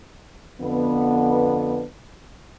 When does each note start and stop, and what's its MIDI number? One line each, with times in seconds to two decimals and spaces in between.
0.61 1.82 41
0.61 1.82 50
0.61 1.82 59